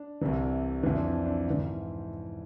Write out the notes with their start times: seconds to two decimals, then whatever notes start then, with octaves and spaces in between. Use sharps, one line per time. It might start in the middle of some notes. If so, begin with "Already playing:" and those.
Already playing: D4
0.21 C2 C3 E3
0.83 F2 E3 E4
0.95 D4
1.05 C4
1.26 D4
1.46 G#2 E3